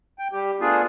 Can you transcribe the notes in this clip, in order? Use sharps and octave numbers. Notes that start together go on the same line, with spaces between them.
G5
G3 G4
A3 B3 D4 F4 G#4